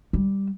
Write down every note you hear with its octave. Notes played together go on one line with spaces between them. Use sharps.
G3